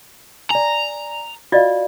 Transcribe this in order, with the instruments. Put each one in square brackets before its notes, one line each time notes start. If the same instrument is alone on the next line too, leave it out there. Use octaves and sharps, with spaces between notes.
[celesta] D5 G#5 [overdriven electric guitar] A#5
[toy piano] F4 D5 D#5 [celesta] F#4 F5